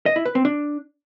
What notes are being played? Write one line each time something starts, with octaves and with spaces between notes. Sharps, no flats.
D#5
E4
B4
C4
D4